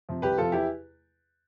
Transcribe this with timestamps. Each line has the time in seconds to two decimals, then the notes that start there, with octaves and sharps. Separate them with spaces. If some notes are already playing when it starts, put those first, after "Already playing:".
0.09 C3 F3
0.22 C2 G4 B4
0.38 C3 F3 F4 A4
0.52 E2 E4 G4